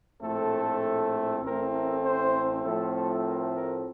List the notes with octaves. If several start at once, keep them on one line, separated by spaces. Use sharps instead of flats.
A#1 A2 A3 C4 A4
A1 A2 A3 C4 A#4
A#4
C5
A2 F3 A3 C4 A4
A4
A#4
A#4